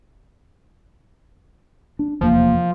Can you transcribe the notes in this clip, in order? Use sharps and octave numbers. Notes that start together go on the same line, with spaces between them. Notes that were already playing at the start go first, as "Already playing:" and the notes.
D4
F1 E2 F3 A#3